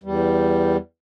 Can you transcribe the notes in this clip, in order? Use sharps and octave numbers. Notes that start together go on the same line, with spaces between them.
E2 G3